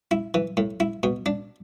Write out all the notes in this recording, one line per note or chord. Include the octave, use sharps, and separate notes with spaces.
E4
E3
A2
E4
B2
D4